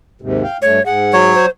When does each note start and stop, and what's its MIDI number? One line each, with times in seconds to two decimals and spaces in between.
0.21 0.43 39
0.21 0.43 44
0.21 0.43 48
0.44 0.57 77
0.44 0.57 79
0.62 0.79 43
0.62 0.79 57
0.62 0.84 73
0.86 1.33 44
0.86 1.33 68
0.86 1.15 78
1.13 1.46 54
1.13 1.46 73
1.35 1.50 72